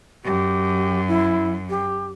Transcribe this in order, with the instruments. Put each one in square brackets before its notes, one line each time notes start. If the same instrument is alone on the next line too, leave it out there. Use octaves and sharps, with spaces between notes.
[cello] F#2 [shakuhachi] G4
[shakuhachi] E4
G4